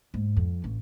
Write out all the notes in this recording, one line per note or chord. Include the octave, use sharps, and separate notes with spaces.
G#2
F2
A1